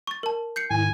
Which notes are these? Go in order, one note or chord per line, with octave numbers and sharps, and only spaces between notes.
C#6 A6
A#4 A5
G6 C7 C#7
G#2 D#3 E4 G#5